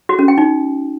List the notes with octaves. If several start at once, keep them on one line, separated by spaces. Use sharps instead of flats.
F#4
C#4
G5
D#4